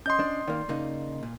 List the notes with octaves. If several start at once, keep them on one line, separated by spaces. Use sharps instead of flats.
C#4 D#5 C6 D#6 G6
D4
D#3 A#3 D5
C#3 A#3 D#4
A#2